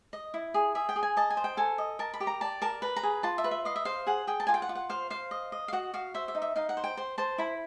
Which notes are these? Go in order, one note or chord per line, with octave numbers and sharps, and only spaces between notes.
D#5
E4
G#4
G#4 E5
G5
G#4
G#5
D#5 A5
G#5
C5
G5
A4 G#5
D#5
A#4 A5
B5
G4
A#5
D5 A5
A#4 A5
B4 A#5
A#5
G#4
F4 A5
E5
B4
E5
D#5 F5
E5
C5 F5
G#4 F#5
G#4 G5
A5
F4 G#5
G5
F#5
F4
F#5
C5 F5
C5 F5
D#5
D#5
F5
F#4 F#5
F#4 F5
C5 E5
E5
D#4
E5
D#4 F5
F#5
C5
G5
C5
C5 A5
E4 B5